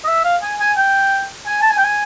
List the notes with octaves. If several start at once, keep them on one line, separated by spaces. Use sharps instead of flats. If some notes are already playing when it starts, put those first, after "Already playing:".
D#5
E5
F5
G#5
G#5
G5
G#5
A5
G#5
G5
G#5